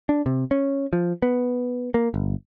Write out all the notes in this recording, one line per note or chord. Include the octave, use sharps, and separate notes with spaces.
D4
C3
C#4
F3
B3
A#3
G1